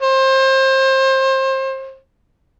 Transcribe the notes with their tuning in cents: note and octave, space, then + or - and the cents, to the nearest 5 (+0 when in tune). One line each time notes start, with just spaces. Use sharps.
C5 +30